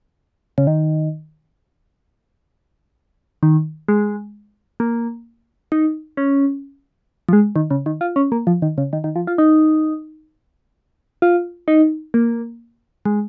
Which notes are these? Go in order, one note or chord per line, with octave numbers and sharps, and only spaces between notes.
C#3
D#3
D#3
G#3
A#3
D#4
C#4
F3
G#3
D#3
C#3
D#3
F4
C#4
A#3
F3
D#3
C#3
D#3
D#3
F3
F4
D#4
F4
D#4
A#3
G#3